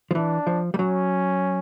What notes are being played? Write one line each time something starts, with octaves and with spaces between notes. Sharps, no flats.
F3
E3 D4
F3
G3
F#3 C#4